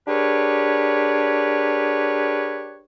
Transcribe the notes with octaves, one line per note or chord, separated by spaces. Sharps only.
D4 G4 G#4 A#4 B4 C#5